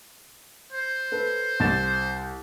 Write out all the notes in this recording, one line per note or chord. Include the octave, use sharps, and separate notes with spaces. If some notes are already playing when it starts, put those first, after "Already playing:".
C5
A4 B4
C2 A6 E7